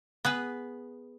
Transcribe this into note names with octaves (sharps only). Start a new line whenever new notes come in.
B3 G#4 B4